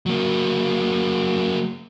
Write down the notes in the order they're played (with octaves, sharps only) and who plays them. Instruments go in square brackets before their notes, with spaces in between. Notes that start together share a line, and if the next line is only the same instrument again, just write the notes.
[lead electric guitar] F#3 A#3